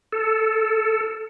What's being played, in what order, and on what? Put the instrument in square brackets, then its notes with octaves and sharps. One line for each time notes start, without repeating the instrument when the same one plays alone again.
[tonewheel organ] A4